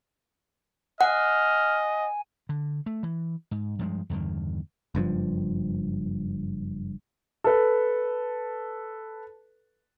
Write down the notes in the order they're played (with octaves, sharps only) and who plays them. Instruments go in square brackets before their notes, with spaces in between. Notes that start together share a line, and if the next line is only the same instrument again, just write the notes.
[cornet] D#5 [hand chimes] F#5 [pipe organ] G#5 [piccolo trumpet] F6
[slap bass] D3
A3
E3
G#2
G2 F3 F#3 G#3
E2 G2 D3 D#3
[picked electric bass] F#1 G2 C#3 F3
[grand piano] A4 B4